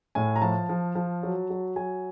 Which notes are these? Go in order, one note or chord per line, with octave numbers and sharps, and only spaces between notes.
A2 G#5
A#5
F3 A5
F3
F3
F#3
F#3
F#3 G#5